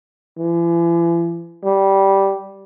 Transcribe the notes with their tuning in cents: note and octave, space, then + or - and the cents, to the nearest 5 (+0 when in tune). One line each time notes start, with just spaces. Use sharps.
E3 +45
G3 -10